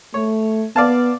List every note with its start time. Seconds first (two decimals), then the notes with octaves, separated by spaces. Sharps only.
0.14 A3 C#5
0.76 B3 D5 F5 A5